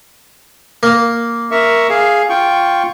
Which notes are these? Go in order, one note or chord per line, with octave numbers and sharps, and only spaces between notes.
A#3
A#4 E5 C#6
G#4 F5
F4 G5 C#6